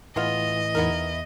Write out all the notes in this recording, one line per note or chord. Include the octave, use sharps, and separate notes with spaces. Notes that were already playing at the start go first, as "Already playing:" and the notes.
A2 E3 G#3 B3 F4 D#5
E2 B3 D#4 E4 A#4 E5